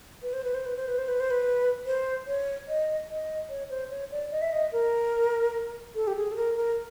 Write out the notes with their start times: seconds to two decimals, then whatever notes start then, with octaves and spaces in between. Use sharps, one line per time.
0.22 B4
0.33 C5
0.44 B4
0.54 C5
0.66 B4
0.76 C5
0.88 B4
0.98 C5
1.08 B4
1.20 C5
1.30 B4
1.86 C5
2.27 C#5
2.68 D#5
3.09 D#5
3.49 C#5
3.70 C5
3.91 C#5
4.11 D5
4.32 D#5
4.42 E5
4.52 D#5
4.72 A#4
5.95 A4
6.07 G4
6.16 G#4
6.32 A4
6.36 A#4
6.57 A#4